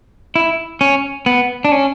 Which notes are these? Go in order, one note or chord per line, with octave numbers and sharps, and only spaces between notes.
E4
C#4
B3
D4
C#4